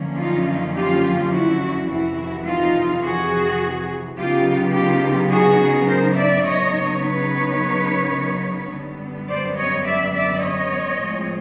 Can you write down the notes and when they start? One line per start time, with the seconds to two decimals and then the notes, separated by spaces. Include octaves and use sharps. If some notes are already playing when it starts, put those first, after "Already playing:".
Already playing: F#2 D3 F3 A#3 C#4
0.19 D#4 F4
0.76 F4 G4
1.33 E4 F#4
1.90 F2 C3 E3 E4 F#4
2.46 D#4 F4
3.03 F#4 G#4
4.17 C#3 F#3 B3 D#4 F4 G4
4.74 F4 G4
5.31 F#4 G#4
5.88 A#4 C5
6.16 D5 E5
6.44 C#3 F#3 B3 D#4 C#5 D#5
7.01 B4 C#5
8.72 F#2 D3 G3 B3
9.29 C5 D5
9.57 C#5 D#5
9.85 D5 E5
10.14 D5 E5
10.42 C#5 D#5
11.00 A2 F3 G#3 C4